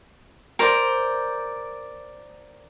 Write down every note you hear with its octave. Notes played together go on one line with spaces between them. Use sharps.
A#4 C5 D5